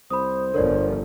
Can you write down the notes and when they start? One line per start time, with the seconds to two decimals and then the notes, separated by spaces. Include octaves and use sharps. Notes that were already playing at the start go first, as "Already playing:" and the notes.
0.10 C2 C5 B5 D#6
0.54 G1 D3 F3 A#4 C#5 D5